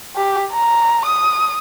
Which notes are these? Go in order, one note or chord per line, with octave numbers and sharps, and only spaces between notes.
G4
A#5
D#6